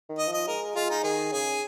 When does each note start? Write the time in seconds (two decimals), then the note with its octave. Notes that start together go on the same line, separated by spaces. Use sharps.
0.09 D#3
0.18 D#5
0.28 F3
0.33 D#5
0.47 G#3 A#4
0.75 G#3 F4
0.90 D#4
1.04 D#3 G#4
1.32 C#3 G#4